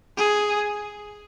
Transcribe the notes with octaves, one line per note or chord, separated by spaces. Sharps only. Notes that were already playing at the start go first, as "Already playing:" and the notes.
G#4